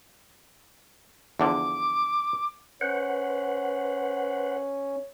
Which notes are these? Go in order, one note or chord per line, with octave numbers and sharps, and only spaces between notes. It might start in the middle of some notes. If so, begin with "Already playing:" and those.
E2 D3 F3 D6
C#4 B4 C5 F#5